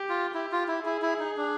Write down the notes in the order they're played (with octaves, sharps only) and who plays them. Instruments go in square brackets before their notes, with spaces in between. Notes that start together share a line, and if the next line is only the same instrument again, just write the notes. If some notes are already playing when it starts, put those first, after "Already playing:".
Already playing: [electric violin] G4
[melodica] F4
[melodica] E4 [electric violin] G4
[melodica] F4
E4
[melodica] E4 [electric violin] G#4
[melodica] E4
D#4
D4